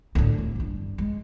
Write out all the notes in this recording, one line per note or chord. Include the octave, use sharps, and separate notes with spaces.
D2 A2
C3
G1 G2
G#3